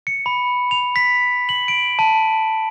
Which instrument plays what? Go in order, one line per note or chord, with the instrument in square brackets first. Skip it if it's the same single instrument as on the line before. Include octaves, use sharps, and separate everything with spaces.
[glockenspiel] C#7
B5
F7
B6
F#7
D7
A5